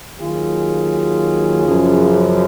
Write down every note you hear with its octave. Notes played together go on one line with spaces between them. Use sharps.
D#2 D#3 F#3 F4 G#4
F#2 C#3 F3